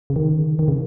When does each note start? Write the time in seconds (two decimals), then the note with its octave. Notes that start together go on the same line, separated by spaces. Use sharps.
0.10 C#3
0.16 D#3
0.59 D#3
0.68 C#3